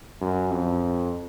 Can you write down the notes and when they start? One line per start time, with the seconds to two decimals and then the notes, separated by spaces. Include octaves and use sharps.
0.21 F#2
0.51 F2